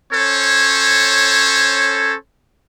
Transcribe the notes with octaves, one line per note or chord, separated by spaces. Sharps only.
C#4 A4 C5 C#5